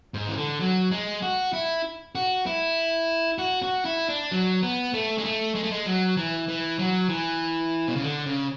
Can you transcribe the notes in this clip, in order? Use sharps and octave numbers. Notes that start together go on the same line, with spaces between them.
G#2
E3
D3
F#3
G#3
F#4
E4
F#4
E4
F#4
F#4
E4
D4
F#3
B3
A3
G#3
A3
G#3
A3
G#3
F#3
E3
E3
F#3
E3
B2
C#3
D3
C#3